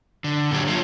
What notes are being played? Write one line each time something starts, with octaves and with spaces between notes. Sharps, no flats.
D3
A#2 D3 F#3 G4 C#5
F4 A4 C#5